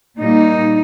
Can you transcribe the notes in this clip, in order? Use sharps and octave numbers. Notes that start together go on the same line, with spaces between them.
A#2 G3 A#3 D#4